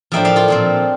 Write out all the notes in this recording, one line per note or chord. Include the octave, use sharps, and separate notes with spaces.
A2 F3 A#3 D4 E5 G5
D5 F5
F4 A4
A#2 F3 C4